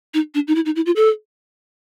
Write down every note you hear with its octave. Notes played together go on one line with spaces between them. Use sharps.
D#4
D4
D#4
E4
D#4
E4
F4
A4